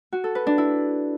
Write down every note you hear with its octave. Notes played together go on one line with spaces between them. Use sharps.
F#4
A4
B4
D4
E4